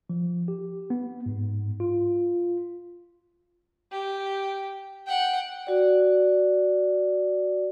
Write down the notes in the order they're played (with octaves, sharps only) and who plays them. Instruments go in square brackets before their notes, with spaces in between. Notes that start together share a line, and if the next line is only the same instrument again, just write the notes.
[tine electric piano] F3
G4
B3
G#2
F4
[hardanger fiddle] G4
F#5 G5
[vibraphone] F#4 D5